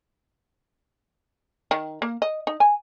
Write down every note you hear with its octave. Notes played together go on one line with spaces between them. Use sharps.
D#3
A#3
D#5
D#4
G#5